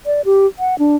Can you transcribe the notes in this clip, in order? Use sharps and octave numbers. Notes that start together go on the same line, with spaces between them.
D5
G4
F#5
D4